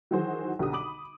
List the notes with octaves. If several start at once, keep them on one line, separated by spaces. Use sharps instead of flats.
D#3 E3 F#3 F#4 G#4 C5
B1 D3 G4 D#6
B5 D6 D#6 F#7